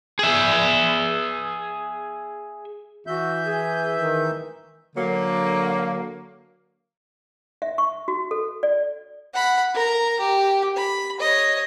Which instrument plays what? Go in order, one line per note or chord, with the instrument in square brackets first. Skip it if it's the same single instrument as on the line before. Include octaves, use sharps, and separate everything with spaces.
[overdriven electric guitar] G#4 E5
[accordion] E3 E5 G6 [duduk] F#4
[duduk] G#4
D#3
[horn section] D3 F#3 A#3
[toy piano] E5
C#6
F#4
A4
D5
[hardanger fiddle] F#5 B5
A#4 A#5
G4
B5
C#5 D#5